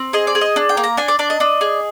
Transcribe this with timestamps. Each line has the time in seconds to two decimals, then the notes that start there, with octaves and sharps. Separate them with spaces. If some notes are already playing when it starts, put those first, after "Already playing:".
Already playing: C4
0.13 G#4 D#5
0.27 D5
0.35 G#4
0.41 D#5
0.56 D4
0.69 G5
0.77 A#3
0.84 A#5
0.97 D4 G#5
1.08 D5
1.19 D4 D5
1.30 D#5
1.40 D4
1.61 G#4